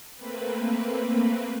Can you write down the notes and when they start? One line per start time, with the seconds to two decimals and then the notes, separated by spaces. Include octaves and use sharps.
0.15 A3 A#3 C4 B4